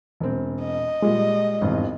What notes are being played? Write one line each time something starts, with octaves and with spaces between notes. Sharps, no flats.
E1 C4
D#5
A#2 G3 G#3
G#1 E2 G2